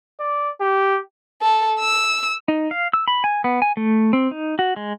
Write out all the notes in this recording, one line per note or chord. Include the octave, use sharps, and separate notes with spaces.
D5
G4
A4
E6
D#4
F5
E6
B5
G#5
B3
G#5
A3
C4
D#4
F#4
G#3